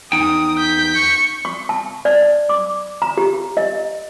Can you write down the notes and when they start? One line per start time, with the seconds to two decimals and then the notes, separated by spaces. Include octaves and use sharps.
0.12 E2 D#4 G5 D#6
0.59 G6 B6
0.95 C#6
1.45 C#6
1.69 A5
2.05 D5
2.49 D6
3.02 A#5
3.17 G4
3.57 D#5